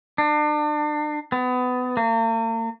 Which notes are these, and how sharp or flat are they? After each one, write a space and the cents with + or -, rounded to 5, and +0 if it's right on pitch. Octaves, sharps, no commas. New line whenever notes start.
D4 +35
B3 +25
A#3 -45